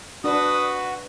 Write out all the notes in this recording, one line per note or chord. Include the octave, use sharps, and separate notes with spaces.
D4 F#4 B4 D#6